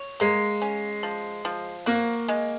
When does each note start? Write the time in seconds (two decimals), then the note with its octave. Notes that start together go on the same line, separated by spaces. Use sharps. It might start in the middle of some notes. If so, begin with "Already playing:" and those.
Already playing: C#5
0.20 G#3 A#3
0.62 C#4
1.03 F3
1.45 F3
1.86 A#3 F#4
2.28 G#3